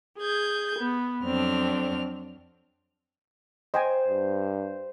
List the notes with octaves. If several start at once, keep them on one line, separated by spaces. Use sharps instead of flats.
G#4 G6 G#6
B3
F2 F#3 C4 D4 F6
C5 D#5 G5 G#5
G2